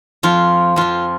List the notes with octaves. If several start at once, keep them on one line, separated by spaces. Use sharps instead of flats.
F2 F3 F4
F2 F3 F4